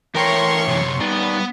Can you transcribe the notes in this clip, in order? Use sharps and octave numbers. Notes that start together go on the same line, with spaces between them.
E3 A3 A#4 C#5 G5 C6 C#6
F#2 C3
G3 B3 D#4 D5